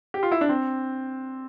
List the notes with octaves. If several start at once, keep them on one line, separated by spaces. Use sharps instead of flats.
G4
F4
E4
D4
C4